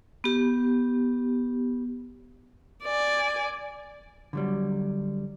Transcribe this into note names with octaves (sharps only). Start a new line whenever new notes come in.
B3 G4
D5 G#5
D3 F#3 G3